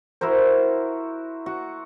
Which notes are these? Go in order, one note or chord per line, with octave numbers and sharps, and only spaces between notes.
E4 F#4 A#4 C5
F#4